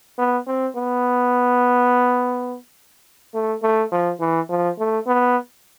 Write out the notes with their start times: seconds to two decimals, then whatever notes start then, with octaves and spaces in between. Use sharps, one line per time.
0.19 B3
0.47 C4
0.76 B3
3.35 A3
3.63 A3
3.92 F3
4.20 E3
4.50 F3
4.79 A3
5.07 B3